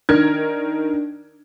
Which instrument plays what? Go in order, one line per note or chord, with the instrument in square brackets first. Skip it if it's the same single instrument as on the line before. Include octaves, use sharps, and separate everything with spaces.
[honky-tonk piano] D#3 A#4 G#6 [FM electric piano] D4